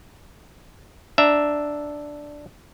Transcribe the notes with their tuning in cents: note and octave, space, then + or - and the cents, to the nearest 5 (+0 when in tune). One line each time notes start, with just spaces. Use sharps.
D4 +0 E5 +0 A#5 +0